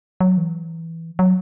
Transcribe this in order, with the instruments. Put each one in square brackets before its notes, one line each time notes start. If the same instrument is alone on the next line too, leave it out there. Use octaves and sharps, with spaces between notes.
[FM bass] F#3
E3
F#3